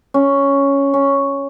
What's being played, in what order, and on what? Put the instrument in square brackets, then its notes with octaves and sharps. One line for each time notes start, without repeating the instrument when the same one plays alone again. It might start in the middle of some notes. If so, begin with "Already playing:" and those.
[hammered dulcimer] C#4
C#4